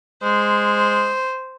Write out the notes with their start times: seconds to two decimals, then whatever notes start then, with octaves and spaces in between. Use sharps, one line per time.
0.23 G#3 C5